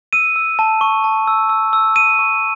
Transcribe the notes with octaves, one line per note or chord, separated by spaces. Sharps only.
E6 D#7
E6
A5
C#6
A5
E6
E6
E6
E6 D#7
C#6